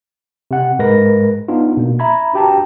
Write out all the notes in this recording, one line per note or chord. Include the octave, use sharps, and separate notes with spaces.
C3 F#5
G#2 G#3 A#4 B4 A#6
B3 D4 D#4 F4
B2 A#3
E5 A#5 B5 G#6
D4 F#4 G4 G5 A5 A#5